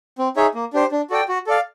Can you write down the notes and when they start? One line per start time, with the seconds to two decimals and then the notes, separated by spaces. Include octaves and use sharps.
0.18 C4
0.36 D#4 G#4 C#5 E5
0.55 A#3
0.73 D4 G4 C5
0.92 D4
1.10 F#4 A4 D5 G5
1.28 F#4
1.47 A4 D5 F5